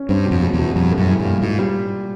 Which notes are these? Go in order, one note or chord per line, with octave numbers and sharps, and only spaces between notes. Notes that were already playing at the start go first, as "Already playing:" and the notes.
Already playing: C#4
G2 C4
B2
F2
G#3
E2
B2
F2 G3
A2
F#2
E3
G2
A#3
G#2 F4
G3